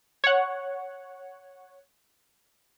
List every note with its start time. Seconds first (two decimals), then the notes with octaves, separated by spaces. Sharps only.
0.24 C#5 F#5